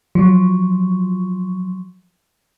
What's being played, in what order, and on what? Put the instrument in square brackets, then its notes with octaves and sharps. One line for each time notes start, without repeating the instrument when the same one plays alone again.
[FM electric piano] F3 F#3